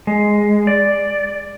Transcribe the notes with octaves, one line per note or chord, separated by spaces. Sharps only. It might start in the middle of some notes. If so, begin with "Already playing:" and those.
G#3
D5